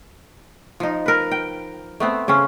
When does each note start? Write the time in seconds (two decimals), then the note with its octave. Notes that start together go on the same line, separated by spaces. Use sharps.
0.80 F3 D#4
1.06 A#4 B4
1.31 G5
2.00 A3 B3 C4
2.28 C#3 C4 C#4